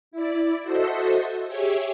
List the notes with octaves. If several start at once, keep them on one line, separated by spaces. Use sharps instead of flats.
E4 D5
F#4 A4 C5 D#5 E5
G4 G#4 C#5 E5